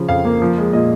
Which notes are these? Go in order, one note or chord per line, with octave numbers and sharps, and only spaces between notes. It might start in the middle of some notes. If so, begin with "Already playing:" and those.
Already playing: C#3 F3
F2 F5
A#3
F3
G#3
A#2 D#5